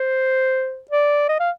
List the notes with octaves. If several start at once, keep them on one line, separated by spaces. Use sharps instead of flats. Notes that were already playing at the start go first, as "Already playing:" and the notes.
Already playing: C5
D5
D#5
F5